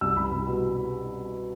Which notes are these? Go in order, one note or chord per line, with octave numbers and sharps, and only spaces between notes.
C2 E6
C2 B5
C2
B2